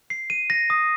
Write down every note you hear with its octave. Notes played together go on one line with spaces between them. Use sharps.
C7
D#7
A#6
D#6